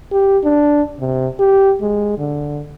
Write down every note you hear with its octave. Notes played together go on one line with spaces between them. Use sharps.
G4
D4
C3
G4
G#3
D3